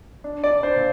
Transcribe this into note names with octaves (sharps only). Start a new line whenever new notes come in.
D4
D5
D4
C5
A#2